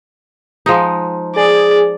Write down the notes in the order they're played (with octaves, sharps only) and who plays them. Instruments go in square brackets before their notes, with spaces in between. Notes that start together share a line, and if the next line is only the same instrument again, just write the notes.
[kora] F3 G#3 D#4
[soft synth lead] G#4 [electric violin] D5